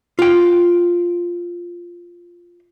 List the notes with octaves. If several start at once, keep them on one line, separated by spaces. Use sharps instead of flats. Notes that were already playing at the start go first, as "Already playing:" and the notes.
F4 G5